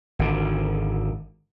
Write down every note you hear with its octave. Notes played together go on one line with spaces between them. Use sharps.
G#1 D3